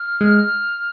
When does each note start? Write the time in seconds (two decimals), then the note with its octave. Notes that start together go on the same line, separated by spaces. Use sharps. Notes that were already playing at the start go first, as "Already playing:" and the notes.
Already playing: F6
0.21 G#3